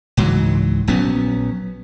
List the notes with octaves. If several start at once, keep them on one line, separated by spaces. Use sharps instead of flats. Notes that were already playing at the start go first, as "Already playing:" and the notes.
C#2 G#2 E3 F#3
A#1 F#3 B3 C#4